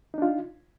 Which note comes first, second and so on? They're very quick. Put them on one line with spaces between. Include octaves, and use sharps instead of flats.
D#4 D4 F4